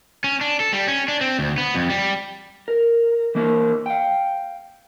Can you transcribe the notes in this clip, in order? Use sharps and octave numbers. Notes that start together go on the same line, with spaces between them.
C#4
D4
A4
G3
C#4
D4
C4
D2
B3
F2
G3
A#4
E3 A#3 A#4
F5 G5